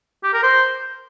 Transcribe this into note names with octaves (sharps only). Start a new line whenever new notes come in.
G4
A#4
C5